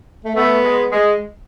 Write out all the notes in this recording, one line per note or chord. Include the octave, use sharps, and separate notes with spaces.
A3
A3 B3
G#3
G#3